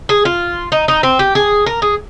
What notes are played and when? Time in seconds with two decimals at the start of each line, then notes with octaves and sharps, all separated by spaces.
0.09 G#4
0.25 F4
0.72 D#4
0.88 D#4
1.03 C4
1.19 G4
1.35 G#4
1.66 A#4
1.82 G#4